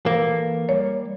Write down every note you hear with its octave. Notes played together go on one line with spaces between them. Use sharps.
E3 A#3 A4 B4
G3 C#5 D5